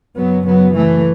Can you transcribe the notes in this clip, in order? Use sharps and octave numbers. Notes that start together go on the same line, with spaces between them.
F#2 C#3 F#3 B3
F#3 B3
E3 A3